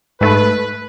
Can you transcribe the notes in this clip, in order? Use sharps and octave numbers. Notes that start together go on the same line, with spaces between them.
G#2 A3 B4